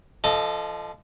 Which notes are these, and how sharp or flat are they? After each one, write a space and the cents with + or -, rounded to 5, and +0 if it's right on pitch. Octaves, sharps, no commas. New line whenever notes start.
F3 -25 A4 +0 D#5 -15